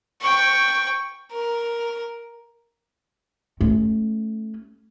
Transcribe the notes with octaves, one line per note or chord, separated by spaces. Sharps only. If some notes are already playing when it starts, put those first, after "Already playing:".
G5 C#6
A#4
A3 C#4